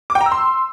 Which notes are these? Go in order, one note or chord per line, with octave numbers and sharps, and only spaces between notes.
D6
G5
A#5
E6
C6